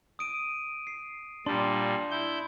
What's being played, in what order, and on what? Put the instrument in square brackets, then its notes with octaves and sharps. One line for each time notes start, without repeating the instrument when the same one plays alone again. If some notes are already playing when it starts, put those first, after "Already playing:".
[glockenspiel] D#6 D7 D#7
C7
[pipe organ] A#2 G3 [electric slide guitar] D4 [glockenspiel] C6
[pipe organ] E4 G6